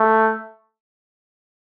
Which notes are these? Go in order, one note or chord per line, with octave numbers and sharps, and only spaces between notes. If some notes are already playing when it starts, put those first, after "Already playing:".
Already playing: A3